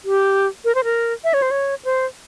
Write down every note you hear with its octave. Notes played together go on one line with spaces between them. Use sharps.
G4
A#4
C5
A#4
E5
C#5
C5
C#5
C5